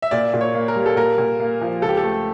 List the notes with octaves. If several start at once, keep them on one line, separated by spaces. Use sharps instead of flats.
E5
A#2 D5
A#2
C#5
A#3
A#4
G3
A4
A#2 A#4
A#2
A#3
F3
C#2 A4
G4
A4
A3